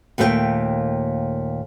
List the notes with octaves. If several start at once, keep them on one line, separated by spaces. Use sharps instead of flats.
D#2 A#2 A3 A4 G5